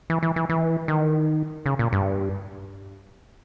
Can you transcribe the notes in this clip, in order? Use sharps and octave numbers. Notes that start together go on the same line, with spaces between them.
E3
E3
E3
E3
D#3
C#3
A#2
G2